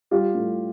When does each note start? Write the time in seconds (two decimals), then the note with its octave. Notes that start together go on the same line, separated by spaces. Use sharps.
0.11 G3 F4 G4
0.35 A2